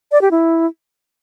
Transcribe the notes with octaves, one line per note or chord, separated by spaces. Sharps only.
D5
G4
E4